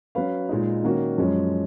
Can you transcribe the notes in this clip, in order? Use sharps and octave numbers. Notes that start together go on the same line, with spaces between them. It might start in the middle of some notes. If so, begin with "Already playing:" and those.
F#3 C#4 F#4 B4 F5
A#2 G#3 D#4
D#3 A#3 C#4 F#4
F#2 F3 G#3 C#4